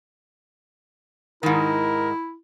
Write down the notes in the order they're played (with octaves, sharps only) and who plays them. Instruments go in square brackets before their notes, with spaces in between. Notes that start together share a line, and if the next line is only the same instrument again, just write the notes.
[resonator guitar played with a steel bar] G#2 D#3 [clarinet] E4 [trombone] A#4